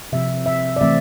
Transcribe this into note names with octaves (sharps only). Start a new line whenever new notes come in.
C3 F3 C4 E5
E5
D5
E3 A3 C4 E5